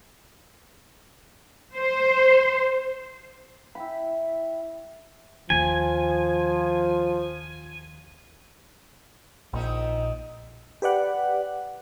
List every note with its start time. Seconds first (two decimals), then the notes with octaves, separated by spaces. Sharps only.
1.74 C5
3.75 E4 G5 B5
5.50 D#2 F3 G#5
9.53 A#1 D#3 D#4 E5
10.82 G4 B4 D5 F#5